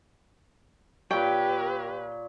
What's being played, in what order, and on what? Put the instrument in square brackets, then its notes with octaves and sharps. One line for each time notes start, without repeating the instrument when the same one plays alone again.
[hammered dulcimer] A#2 C#5 [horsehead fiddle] G4 B4 [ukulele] G5